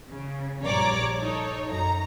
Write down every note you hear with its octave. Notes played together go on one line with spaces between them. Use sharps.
C#3
A#1 G2 C#5 D5 A#5 D6
D#4 A4 C#5
F#2 A#5